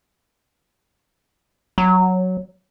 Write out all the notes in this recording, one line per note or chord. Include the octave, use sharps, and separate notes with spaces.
F#3